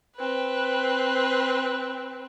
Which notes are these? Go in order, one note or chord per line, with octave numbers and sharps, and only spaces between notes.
C4 B4